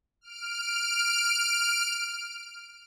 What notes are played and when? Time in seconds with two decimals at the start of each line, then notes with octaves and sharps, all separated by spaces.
0.21 F6 D7